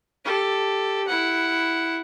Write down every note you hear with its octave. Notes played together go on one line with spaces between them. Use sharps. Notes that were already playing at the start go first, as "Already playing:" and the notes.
G4 A4
E4 F#5